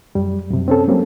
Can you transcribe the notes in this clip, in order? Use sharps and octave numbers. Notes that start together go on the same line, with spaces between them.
F#2 G3
F#2 C3
C4 C#4 A4
F#3 G3 A#3 C4 C#4